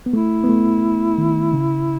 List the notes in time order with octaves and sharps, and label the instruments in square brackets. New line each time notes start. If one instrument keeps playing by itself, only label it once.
[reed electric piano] B3
[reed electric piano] A3 [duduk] E4
[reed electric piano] B3
A3
D#3
C#3